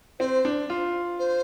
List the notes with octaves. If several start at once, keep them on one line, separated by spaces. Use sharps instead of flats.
C4 C5
D4
F4
C5